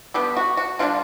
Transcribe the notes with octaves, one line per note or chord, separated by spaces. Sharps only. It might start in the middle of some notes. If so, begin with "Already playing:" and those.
D3 G3 B3 G4
F#4
F#4
D3 G3 A#3 D4 F4